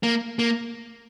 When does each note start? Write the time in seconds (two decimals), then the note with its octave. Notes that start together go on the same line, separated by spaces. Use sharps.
0.03 A#3
0.39 A#3